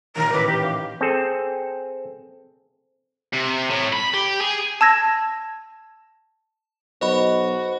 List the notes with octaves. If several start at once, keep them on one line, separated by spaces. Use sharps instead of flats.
A1 A#2 D#3 A#4
D#3 C#4 E4 B4 D6
E3 G4
F5 C6
C4 G#4 A4
C3
A2
B5
G4
G#4
A5 E6 G#6 A#6
B1 F#4 C5 D#5 B5